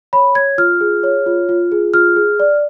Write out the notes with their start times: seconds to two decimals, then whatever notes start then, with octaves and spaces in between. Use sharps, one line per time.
0.13 C#5 B5
0.35 C#5 G#6
0.58 F4 F6
0.81 G#4
1.03 C#5
1.26 F4
1.49 F4
1.72 G#4
1.94 F4 F6
2.16 G#4
2.40 D5